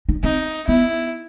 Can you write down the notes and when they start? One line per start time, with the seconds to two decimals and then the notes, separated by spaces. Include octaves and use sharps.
0.09 D#4
0.23 C4 D#4
0.68 B3 E4